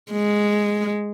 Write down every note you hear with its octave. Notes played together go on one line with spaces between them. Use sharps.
G#3